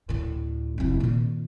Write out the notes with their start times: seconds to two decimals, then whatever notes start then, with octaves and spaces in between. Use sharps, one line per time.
0.09 D2 A2
0.78 F1 E4
1.00 A#2 D#3